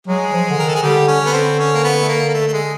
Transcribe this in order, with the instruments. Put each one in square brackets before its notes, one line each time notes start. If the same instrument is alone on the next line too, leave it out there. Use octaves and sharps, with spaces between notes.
[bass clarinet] F#3 [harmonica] G#3 G#4
[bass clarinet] F3
D3
[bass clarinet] D#3 [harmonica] A#4
[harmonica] A4
G#4
[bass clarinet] D3 [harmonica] G3 G4
[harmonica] C#4
[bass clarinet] D3
[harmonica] B3
C4
C#4
A#3
B3
A3
A#3
A#3
A3
A3
G#3